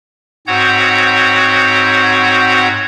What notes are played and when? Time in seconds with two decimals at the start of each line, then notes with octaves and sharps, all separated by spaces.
0.47 G#2 C4 F#4 C#5 F#5 G6